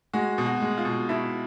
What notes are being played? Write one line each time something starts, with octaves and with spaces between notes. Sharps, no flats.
G#3 F#4
B2
F#4
G#3
F4
B2
B2 E4